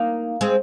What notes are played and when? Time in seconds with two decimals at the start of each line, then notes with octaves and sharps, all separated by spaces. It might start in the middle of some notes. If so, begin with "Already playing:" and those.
Already playing: A#3 D#4
0.41 G#3 C4